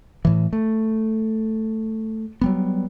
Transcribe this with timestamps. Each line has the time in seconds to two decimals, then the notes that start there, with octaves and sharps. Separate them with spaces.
0.25 A2 E3
0.53 A3
2.41 F#3 G3 B3